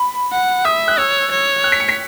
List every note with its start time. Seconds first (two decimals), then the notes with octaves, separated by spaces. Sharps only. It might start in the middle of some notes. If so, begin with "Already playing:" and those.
Already playing: B5
0.32 F#5
0.65 E5 D#6
0.88 F#6
0.98 C#5 E6
1.31 C#5
1.64 F#6
1.72 B6
1.80 C#7
1.89 B6